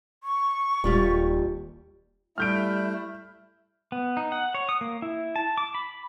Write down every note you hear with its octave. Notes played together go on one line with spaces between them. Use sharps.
C#6
D#1 G3 F4 G4
G3 A3 E4 F6 G6 D7
B3
D#4
F#5
C#5
D#6
A#3
E4
A5
D6
B5